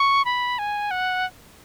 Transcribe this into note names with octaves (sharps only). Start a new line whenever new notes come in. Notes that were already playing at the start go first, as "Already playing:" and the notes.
Already playing: C#6
B5
G#5
F#5